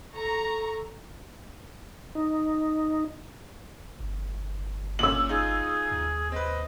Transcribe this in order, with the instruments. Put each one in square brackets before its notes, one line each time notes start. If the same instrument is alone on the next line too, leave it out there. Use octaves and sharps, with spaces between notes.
[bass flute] A4 [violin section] A#5 C#6
[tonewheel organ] D#4
[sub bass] G1
[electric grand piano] A#2 C#4 [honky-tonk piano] E6 F#7
[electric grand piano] D#4 F4 [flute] G#4
[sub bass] D#2
[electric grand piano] C4 B4 [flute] D#5